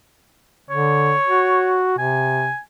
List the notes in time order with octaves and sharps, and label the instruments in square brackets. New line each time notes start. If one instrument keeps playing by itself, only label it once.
[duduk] D3 [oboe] C#5
[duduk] F#4
[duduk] C3 [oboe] G#5